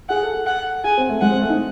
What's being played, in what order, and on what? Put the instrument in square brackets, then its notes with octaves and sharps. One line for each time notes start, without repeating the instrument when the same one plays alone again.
[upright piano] G#4 [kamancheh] F#5
[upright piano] A4
A4
[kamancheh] F#5
[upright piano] G#4 [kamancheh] G#5
[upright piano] C4
A3
[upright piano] G#3 [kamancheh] F#5
[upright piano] C4
A3
D#4